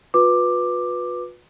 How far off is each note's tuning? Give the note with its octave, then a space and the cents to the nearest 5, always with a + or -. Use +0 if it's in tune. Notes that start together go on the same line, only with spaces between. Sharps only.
F4 +45 B4 -5 D6 +10